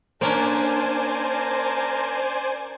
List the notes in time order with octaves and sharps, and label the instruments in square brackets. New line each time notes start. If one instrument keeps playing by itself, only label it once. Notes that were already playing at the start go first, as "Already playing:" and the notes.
[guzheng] A#3 C#4 D4 [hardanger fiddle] A#4 A5 [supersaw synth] C5 D5 G#5